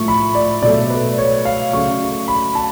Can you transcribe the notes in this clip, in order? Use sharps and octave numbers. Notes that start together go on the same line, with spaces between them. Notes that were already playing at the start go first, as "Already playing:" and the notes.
Already playing: A2 F3 A3 C#6
B5
D5
B2 F#3 A3 D5
B4
C#5
F5
C#3 F#3 A3 C#6
B5
A5